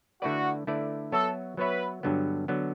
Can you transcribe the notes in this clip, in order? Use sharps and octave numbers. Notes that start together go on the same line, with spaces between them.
D3 A3 E4 F#4 B4 D5
D3 A3 E4 B4 D5
F#3 B3 F#4 A4 C#5 E5
F#3 B3 F#4 B4 C#5 E5
G2 D3 F#3 B3
D3 F#3 B3